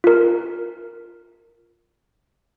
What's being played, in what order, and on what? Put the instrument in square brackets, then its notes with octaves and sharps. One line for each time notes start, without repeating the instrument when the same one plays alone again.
[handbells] F4 A#4